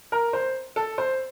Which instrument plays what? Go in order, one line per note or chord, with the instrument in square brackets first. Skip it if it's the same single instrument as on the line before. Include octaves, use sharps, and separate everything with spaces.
[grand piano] A#4
C5
A4
C5